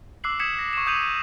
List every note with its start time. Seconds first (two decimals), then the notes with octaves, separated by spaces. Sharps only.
0.24 D6 E6 F#6 C7 F#7
0.39 D#6 G#6 B6 C#7 E7
0.59 A#6
0.73 C#6 E7
0.86 D6 D#6 G6 D#7 F7 F#7
1.02 C#7